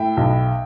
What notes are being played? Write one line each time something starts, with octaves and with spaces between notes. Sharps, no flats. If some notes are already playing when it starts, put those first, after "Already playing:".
Already playing: A2 E5 G5
B1